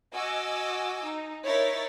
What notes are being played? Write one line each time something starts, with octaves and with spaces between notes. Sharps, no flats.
F#4 D#5 G#5 D6 E6
D#4
D#4 E4 A#4 C#5 A6 B6